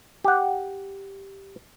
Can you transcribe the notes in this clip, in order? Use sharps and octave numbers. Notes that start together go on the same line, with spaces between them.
G4 F#5